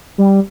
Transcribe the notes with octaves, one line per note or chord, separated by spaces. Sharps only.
G3